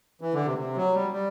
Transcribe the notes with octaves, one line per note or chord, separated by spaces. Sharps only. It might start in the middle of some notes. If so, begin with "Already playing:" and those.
E3
D3
C3
C3
F#3
G3
G3